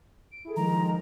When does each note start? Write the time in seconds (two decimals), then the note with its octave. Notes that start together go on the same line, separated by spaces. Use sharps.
0.31 D7
0.45 E4 G#4 A4
0.56 D#3 F3 G#3 A#5